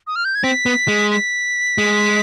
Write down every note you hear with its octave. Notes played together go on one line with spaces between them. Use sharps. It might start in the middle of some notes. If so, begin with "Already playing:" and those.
D#6
F6
G6
G#6
C4 B6
B3
G#3
B6
G#3